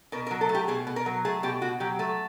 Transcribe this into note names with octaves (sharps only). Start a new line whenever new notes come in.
B2 A#4
A#4
F#3
A4
A3
G4
B2 G#4
B2
A#4
F#3
A3 G#4
B2 G4
B2 F#4
F#3 G4
A3